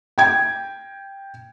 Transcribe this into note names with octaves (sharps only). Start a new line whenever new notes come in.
G5 G#6